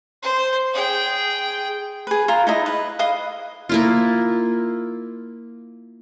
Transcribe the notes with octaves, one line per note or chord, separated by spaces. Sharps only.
C5
G#4 G5
G#4 B4
F4 A#5
D#4 E4 D#5
B4
B4 D#5 F5 D#6
A#3 E4 F4